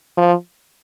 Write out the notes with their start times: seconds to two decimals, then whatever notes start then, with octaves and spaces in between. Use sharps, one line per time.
0.17 F3